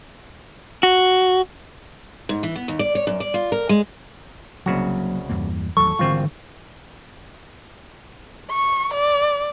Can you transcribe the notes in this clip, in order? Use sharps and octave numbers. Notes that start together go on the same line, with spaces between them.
F#4
G#2
E3
B3
D#2
D5
C#5
F#2
D5
F4
A#4
G#3
C2 C#3 F#3 A#3 F#4
E2 G2 A#3
A1 D#2 F#3 A4 C#6
G#1 D3 E3 G3 C4 F4
C#6
D5